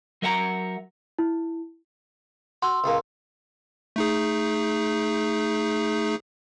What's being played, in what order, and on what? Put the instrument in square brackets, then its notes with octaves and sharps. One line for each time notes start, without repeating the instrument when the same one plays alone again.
[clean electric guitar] F#3 A#4 E5 F#5 A5 A#5
[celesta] E4
[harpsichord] F#4 [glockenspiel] C6 E6
[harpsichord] C#2 C#3 A#3
[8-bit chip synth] A3 D#4 G#4